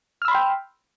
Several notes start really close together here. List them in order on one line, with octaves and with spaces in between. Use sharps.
F6 E6 B5 C6 G5